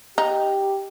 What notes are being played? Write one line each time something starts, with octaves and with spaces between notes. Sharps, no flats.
D#4 G4